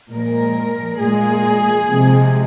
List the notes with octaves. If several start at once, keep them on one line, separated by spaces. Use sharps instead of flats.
A#2 F3 G#3 A#4
A#2 G#3 G#4
C3 F3 G#3